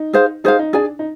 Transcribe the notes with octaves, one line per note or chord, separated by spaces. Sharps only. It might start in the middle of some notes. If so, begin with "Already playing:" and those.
Already playing: D#4
G#4 C5 F5
D#4 G#4 C5 F5
D#4
D4 G#4 D5 G#5
D#4